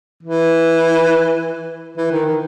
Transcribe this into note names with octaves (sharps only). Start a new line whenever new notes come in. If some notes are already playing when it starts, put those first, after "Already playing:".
E3
E3
D#3
D#3